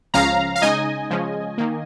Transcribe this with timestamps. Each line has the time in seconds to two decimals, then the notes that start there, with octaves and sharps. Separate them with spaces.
0.14 C#2 C#3 F3 C#4 F5 A#5
0.56 F5
0.62 C#3 G#3 D#4 D#5 G#5
1.10 C#3 F3 G#3 C#4
1.58 D#3 A#3